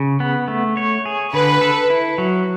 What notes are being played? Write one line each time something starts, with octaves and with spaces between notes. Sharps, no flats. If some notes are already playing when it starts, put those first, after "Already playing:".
Already playing: C#3
B3
A3
C#5
G#4
D3 B4
A4
E4
F#3